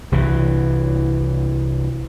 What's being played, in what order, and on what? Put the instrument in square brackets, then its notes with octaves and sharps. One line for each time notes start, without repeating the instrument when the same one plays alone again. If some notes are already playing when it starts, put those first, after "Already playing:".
[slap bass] C2 E3